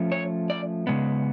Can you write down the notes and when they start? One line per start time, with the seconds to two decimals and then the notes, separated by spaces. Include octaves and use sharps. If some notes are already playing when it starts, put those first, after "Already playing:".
Already playing: F3 A3 C#4
0.12 C#5
0.50 D5
0.87 C#3 G#3 B3